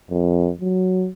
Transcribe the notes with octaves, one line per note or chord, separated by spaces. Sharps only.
F2
F#3